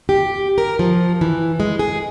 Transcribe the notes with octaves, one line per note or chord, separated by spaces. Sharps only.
G4
A#4
F3
E3
G#3
G#4